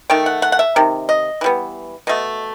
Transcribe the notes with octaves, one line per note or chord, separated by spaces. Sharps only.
D#3 A3 G5
F#5
F#5
F#5
E5
C3 D#3
D#5
E3 G3 B3
B2 A3 D#5